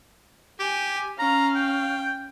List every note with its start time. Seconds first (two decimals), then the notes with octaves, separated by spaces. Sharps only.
0.60 G4 G#5
1.19 C#4 F5 A#5
1.56 G5